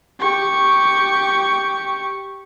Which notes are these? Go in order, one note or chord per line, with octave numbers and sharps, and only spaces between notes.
G4 C#6